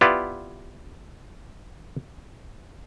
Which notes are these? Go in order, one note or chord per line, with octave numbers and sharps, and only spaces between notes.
B3 E4 F4 G4 B4 D5